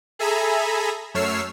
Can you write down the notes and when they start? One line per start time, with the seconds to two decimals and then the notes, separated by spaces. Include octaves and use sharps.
0.19 G#4 A4 E5 G#5 A#5 B5
1.14 F#2 A3 C#5 E6 F6 C7